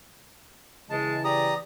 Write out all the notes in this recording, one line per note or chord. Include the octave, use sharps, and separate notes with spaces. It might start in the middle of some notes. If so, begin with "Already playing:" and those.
C#3 E3 G#3 A5
G4 D5 A#5 D#6